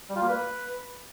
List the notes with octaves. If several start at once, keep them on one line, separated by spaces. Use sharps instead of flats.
G3
F4
A#3
B4